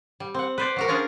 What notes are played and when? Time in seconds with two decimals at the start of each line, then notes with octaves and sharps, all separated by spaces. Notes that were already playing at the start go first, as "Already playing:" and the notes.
0.20 G3
0.34 C4 F#5
0.58 B4 C5 D5
0.76 F#3 F#4 A#4
0.88 C#4 D4 F4 G#4 A#5